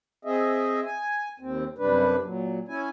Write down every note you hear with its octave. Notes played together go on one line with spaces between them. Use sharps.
C4 G#4 D#5 E5
G#5
D#2 C4
F#2 C3 G3 D4 B4
A#2 F#3
C#4 E4 G#5